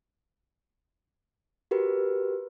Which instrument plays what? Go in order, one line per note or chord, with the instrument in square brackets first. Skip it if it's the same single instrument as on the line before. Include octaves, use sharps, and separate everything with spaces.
[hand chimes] F#4 G4 A#4 B4